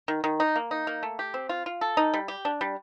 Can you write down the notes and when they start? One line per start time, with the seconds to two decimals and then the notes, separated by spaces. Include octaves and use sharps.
0.08 D#3
0.24 D#3
0.40 D#4
0.56 A#3
0.71 D#4
0.87 A#3
1.03 A3
1.19 G4
1.34 C4
1.49 F4
1.66 F4
1.81 A4
1.97 D#4
2.14 G3
2.28 G4
2.45 D4
2.61 G3